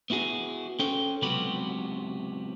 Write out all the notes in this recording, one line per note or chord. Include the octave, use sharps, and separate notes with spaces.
B3 E4 F#4 G#4
C#4 A4 C5 G5
C#2 C3 F#3 B3 G4 B5